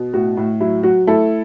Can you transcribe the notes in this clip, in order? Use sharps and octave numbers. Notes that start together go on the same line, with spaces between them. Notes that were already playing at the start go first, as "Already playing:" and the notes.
Already playing: B2
A2 F#4
A2
F#3 E4
F#3 F#4
A3 E4 A4